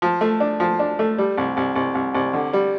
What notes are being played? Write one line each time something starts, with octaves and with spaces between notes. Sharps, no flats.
F3
A3
D4
F3
D4
A3
G3
C2
C2
C2
C2
C2
D3
G3